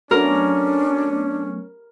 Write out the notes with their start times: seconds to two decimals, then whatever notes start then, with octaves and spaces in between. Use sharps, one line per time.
0.11 F#3 A3 B3 C#4 D4 A#4